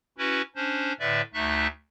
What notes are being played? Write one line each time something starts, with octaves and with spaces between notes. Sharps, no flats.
C#4 E4 F#4 B4
C#4 D4 C5
A2 D3 B4 D5 E5
D2 A3 D#4 E5 F#6